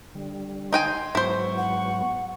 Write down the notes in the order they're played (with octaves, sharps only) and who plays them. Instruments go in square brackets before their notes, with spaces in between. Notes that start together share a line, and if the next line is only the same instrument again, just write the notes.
[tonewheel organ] D3 G3
[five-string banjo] D#4 G5 G#5 [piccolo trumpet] C6
[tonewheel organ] G#2 F#3 B3 [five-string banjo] E4 C5 [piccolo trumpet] C#6
[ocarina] F#5